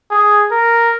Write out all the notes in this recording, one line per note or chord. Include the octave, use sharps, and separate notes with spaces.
G#4
A#4